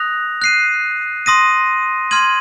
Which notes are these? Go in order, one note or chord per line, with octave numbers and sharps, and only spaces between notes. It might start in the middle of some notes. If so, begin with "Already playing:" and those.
Already playing: D#6 F#6 A#6 F7
F#6 C7 D#7
C6 D#6 A#6 D#7
C6 F6 G#6 D#7 F#7